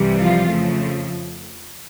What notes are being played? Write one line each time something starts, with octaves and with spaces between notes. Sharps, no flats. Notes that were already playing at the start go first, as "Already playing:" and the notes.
Already playing: C2 C3 E3 G3
F3 F4
F2 C#3 F3 A3